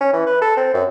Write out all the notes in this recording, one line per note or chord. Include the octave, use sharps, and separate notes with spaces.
C#4
E3
B4
A4
C4
F#2